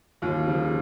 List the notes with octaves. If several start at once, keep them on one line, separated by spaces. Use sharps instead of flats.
D#2 F4
C#3 F3